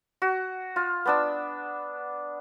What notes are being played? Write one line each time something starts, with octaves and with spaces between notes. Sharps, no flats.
F#4
F4
B3 D4 E6